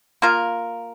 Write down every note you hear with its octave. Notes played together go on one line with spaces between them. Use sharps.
A#3 F4 A#4